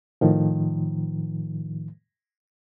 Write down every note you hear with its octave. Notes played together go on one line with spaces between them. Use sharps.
A2 D#3 F3